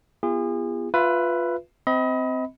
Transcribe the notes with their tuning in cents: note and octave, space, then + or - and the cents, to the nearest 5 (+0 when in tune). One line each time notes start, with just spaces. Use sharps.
B3 -5 F4 -35 G#4 -35
F4 +10 B4 +0 E5 +30
C4 -15 D#5 +35 B5 +0